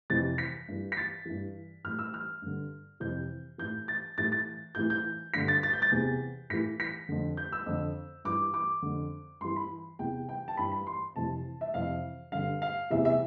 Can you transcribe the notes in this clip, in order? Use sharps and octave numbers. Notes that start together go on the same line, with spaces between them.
F2 C3 E3 A6
B6
G2 E3
B6
A6
G2 E3
A2 E3 F6
E6
F6
G2 D3
F2 C3 E3 G6
A2 E3 G6
A6
A2 E3 A6
A6
A2 E3 G6
G6
G2 D3 B6
A6
A6
G6
A6
E2 C3 E3
A2 E3 B6
B6
F2 D3
G6
E6
F2 D3
G2 E3 D6
D6
F2 D3
G2 E3 C6
B5
E2 C3 E3 G5
G5
A5
G2 E3 B5
B5
C6
F2 C3 E3 A5
E5
F2 C3 E3 F5
G2 D3 F5
F5
E2 C3 E3 E5
E5